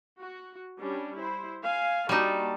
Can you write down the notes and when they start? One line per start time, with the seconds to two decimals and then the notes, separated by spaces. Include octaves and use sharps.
0.19 F#4
0.78 G3 C#4 D4
1.15 E4 C5
1.63 F5 G#5
2.09 G3 A#3 D#4 F#4 A5